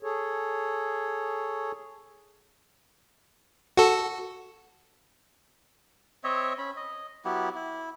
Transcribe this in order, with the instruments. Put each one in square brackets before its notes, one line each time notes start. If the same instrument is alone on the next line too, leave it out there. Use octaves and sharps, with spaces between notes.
[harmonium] G#4 A4 C#5
[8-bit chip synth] F#4 A4
[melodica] C4 C#5 D#5 E5
C#4 B5
D#5
F#3 B3 E4 G4
E4